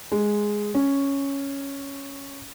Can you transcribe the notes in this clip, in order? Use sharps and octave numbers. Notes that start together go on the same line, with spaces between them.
G#3
C#4